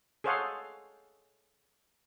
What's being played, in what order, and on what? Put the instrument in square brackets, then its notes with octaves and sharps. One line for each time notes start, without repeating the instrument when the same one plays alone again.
[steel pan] G#4 A4 C5 C#5 F5 F#5